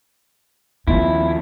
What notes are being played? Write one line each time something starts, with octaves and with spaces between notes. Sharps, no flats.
D#2 F3 B3 E4